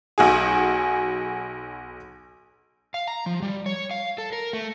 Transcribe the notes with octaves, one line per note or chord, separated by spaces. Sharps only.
B1 F#4 G#4
F5
A#5
F3
G3
C#5
F5
A4
A#4
A3